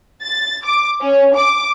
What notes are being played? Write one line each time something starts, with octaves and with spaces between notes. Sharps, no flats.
A6
D6
C#4
D6